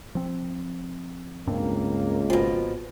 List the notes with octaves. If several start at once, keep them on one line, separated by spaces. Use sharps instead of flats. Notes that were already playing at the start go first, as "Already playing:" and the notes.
F3 C4
C#2 G2 A#3 C4 D4
G#1 B2 F3